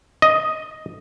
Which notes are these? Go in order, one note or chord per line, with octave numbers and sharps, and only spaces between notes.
D#5